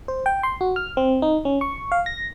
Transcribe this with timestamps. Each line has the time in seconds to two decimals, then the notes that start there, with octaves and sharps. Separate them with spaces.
0.08 C5
0.26 G5
0.43 C6
0.61 F#4
0.76 F6
0.97 C4
1.22 D#4
1.45 C#4
1.61 C#6
1.92 F5
2.06 A#6